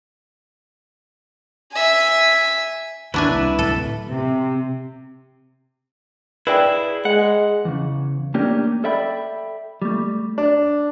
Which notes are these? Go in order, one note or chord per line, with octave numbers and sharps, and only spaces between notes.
E5 G#5
D#2 F#3 D4 E4 B4 G#5
C2
D1 A4
C3
E4 G#4 B4 D5 G5
G#3 F#5
E2 C#3
A3 A#3 C#4 D4 G4
A4 D5 E5 G5 B5
G3 A3
D4